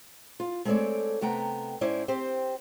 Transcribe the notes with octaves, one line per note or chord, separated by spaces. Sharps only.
F4
G#3 A3 C4 A4 C#5 D5
C3 A3 B3 G5 A#5
G#2 C#4 E4 C5 D5
C4 G4 C5